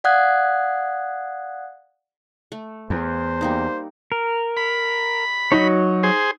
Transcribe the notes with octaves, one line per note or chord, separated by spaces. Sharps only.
D5 F5 F#5 D#6 F#6 G#6
A3
E2 C5
G3 A#3 D#4
A#4
B5
F#3 D#4 F#4 C#5
G#4 C5